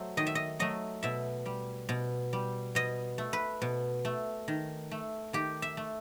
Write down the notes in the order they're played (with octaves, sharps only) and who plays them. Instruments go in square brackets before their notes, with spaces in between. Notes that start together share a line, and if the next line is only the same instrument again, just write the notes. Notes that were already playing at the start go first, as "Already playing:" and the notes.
Already playing: [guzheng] F#3 A3 C5
D#3 D#5
E5
D#5
F#3 A3 D#5
B2 E5
G3
B2
G3
B2 D#5
A3
B4
B2
A3
D#3
A3
D#3 G4
E5
A3